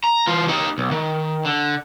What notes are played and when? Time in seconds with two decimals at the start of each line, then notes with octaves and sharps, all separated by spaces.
0.04 A#5
0.27 E3 F4
0.48 D#4 G4
0.78 B1
0.91 D#3
1.45 D3